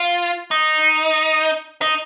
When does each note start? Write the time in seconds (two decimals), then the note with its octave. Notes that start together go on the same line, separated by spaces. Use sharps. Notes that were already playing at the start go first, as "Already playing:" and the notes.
Already playing: F4
0.51 D#4
1.82 D#4